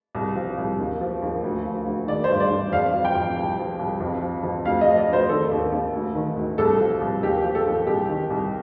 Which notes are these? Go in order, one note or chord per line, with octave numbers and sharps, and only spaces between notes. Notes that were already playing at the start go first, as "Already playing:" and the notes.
C2
F3
C2
D#2
F3
D#2
D2
F3
D2
D#3 D5
C5
G2
D5
G2
F2 F5
F3
G5
F2
C2
F3
C2
F2
F3
F2
D2 F5
F3 D#5
D5
D2 C5
D#3 A4
D#2
D#2
D2
D#3
D2
C2 A4
F3
C2
D#2 G4
F3
A4
D#2
C2 G4
D#3
C2